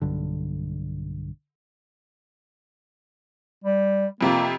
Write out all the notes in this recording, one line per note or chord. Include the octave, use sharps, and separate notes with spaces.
B1 G2 D3
G3
F2 C3 F3 A#3